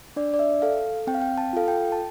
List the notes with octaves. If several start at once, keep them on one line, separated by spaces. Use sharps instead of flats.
D4 D5
D5
E5
A4 F5
C4 G5
F5
G5
A5
F4 A4 F5
G5
A5